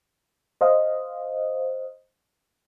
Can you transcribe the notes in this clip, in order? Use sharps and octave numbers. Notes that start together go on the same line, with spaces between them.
C5 D#5 F5